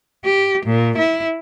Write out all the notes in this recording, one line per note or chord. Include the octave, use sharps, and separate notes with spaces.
G4
A#2
E4